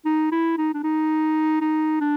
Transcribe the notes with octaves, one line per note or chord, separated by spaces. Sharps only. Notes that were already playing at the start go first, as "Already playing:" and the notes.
D#4
E4
D#4
D4
D#4
D#4
D4